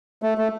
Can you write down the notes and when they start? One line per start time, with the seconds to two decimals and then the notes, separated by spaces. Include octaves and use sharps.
0.22 A3
0.38 A3